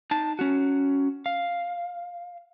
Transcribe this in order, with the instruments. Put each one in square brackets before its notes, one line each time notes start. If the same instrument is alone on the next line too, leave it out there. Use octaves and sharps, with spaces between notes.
[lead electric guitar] D#4 A5
C#4 F#4
F5